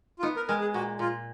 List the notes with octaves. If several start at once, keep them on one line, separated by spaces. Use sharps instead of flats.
F4
B3 D#4
A#4
G#3 A#4
G#4
A#2 F#4
A#2 F4